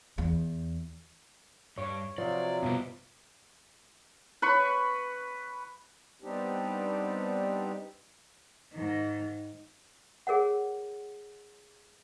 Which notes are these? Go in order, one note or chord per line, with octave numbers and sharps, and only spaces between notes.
E2
G2 G3 C#5
C3 F3 F#3 D5
G2 B2 A#3 B4
B4 B5 C#6
G3 B3 C4 D4 D#4 G4
G#2 D#3
G#4 A#4 C#5 F#5